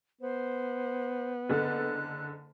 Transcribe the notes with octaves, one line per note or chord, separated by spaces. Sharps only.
B3 C5
F#1 D3 A4 F#6